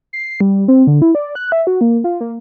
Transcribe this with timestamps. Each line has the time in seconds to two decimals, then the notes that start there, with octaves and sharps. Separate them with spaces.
0.13 C7
0.41 G3
0.68 C4
0.87 D3
1.02 E4
1.15 D5
1.35 F#6
1.52 E5
1.67 F#4
1.81 A#3
2.04 F4
2.21 A#3